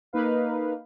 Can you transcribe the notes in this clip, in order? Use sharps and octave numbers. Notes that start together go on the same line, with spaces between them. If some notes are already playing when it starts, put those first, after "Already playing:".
A#3 D#4 B4 F5